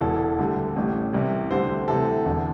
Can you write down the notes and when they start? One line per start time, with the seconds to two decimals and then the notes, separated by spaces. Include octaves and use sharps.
0.01 E1 E2 E3 A4
0.39 D2 D3 G3
0.76 A1 A2 G3
1.13 C2 C3 E3 G3
1.51 D2 D3 G3 C5
1.88 D2 C3 E3 A4
2.25 E1 E2 D3